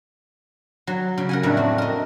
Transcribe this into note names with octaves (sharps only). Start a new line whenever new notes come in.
F#3
C#3
A#4 F#5 G#5
F2 A2 F#3 D4 E5
C4 F#4
A#4 D#5